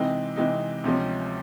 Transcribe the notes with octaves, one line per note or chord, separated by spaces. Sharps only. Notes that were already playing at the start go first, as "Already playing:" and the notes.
Already playing: C3 E3 G#3 C4 D#4
C3 E3 G#3 C4 D#4
D2 C3 F3 G#3 C#4